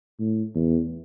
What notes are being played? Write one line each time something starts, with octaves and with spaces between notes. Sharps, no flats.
A2
E2